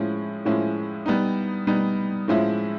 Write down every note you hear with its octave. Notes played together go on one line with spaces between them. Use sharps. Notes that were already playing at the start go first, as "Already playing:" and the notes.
Already playing: A2 F3 G#3 C#4 E4
A2 F3 G#3 C#4 E4
G3 B3 D#4
G3 B3 D#4
A2 F3 G#3 C#4 E4